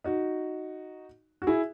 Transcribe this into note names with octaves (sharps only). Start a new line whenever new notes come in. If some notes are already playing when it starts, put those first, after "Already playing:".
D#4 F#4
F#4
E4 G#4